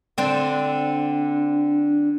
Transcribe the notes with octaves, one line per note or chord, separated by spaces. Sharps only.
D3 C4 D4